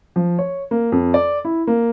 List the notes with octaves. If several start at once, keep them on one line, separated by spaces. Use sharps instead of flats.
F3
C#5
A#3
F2
D5
E4
A#3